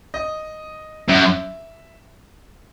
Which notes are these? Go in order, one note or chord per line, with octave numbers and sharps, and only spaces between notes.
D#5
F#2 E5